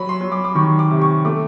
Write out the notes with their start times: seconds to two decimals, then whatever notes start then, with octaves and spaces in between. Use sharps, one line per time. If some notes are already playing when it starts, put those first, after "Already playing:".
Already playing: F#3 B5
0.09 C6
0.21 F#3
0.32 D6
0.44 D6
0.55 D#3 C#6
0.79 D6
0.91 C3
1.02 C#6
1.25 A3 D6